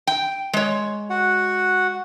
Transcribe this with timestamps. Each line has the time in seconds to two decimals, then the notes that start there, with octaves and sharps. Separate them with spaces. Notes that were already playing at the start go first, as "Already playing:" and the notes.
0.07 G5
0.53 G#3 C#5
1.10 F#4 F#5